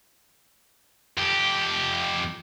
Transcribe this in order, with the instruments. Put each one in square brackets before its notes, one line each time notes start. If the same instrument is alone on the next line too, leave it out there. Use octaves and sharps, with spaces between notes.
[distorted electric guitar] F2 G4